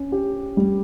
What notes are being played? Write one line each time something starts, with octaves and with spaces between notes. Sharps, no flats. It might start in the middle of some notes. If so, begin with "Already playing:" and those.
Already playing: C#4
G4
G3